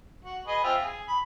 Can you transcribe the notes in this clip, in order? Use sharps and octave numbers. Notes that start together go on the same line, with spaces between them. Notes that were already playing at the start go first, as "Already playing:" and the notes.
F#4
G#4 B4 D#5
C4 F4 E5
G#4
B5